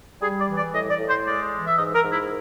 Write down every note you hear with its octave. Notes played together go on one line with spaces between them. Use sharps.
G3 G#4
D5
E3
D5
A2 D#5
D5
A2
C5
G#3 D5
E3
E5
G#2 D#5
A#4
G#2
E4